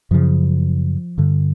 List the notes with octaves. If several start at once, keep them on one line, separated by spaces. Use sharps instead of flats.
F#2 C#3 F3
G2 D3